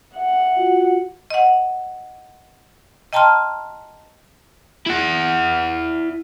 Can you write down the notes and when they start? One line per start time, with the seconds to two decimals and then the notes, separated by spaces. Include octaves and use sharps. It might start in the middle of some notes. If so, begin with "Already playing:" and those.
0.16 E5 F#5
0.57 F4 F#4
1.31 D#5 F#5
3.13 D#5 G5 A5 A#5 C6 F6
4.87 E4 F#5